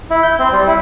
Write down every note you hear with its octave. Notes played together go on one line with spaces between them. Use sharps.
E4
G6
C4
G3
E4